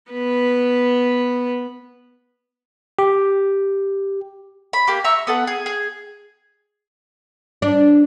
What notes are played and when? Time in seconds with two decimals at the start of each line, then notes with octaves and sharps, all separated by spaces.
0.11 B3 B4
2.99 G4
4.73 B5
4.87 A#3 G4
5.04 E5 A#5 C#6 E6
5.27 B3 A4 F#5
5.47 G#4
5.66 G#4
7.62 D4